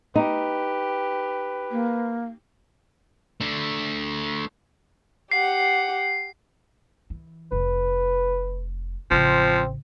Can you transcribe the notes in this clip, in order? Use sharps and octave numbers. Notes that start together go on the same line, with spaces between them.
D#4 G4 B4
A#3
A3 D4
G4 F#5 C7
E3
F1 B4
A1 C#3 F3 C4